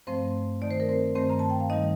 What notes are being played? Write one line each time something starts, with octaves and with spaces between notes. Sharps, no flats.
G2 F3 A3 C4 C5
D#3 A3 D#4 D5
C5
A#4
C4 C5
G2 D#3 A3 C4 C5
A#5
A5
G5
F5
G2 D#3 G3 D#4 D#5